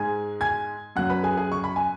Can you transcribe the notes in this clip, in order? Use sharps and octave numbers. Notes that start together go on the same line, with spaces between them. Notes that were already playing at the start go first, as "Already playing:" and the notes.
Already playing: G#2 G#3 G#5 G#6
G#5 G#6
F#2 F#3 F#5 F#6
B4 B5
G#4 G#5
G#4 G#5
C#6
B5
G#5